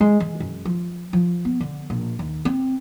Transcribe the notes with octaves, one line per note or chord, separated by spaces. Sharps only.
G#3
E3
F#2
F3
F3
B3
D3
A#1
D#2
C4